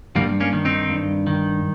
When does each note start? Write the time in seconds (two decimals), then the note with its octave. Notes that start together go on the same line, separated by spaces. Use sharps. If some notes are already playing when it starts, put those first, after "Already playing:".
0.16 G2 G3 A#3
0.40 A#3 C#4
0.53 D#3
0.65 C4 D#4
0.90 G2
1.27 D#3